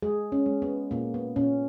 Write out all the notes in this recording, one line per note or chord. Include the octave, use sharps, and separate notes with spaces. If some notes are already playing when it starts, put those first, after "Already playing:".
G#3 G#4
C#4
G#3
B3
A#2 A#3
B3
A#2 C#4